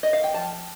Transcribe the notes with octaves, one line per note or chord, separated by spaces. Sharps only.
D#5
F5
G5
F3 A5